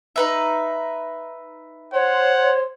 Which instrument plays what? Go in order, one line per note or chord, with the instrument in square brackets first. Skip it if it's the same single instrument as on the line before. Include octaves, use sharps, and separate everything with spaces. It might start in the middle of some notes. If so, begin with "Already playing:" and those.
[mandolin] D#4 B4 E5
[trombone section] C5 [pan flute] C#5 [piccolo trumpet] F#5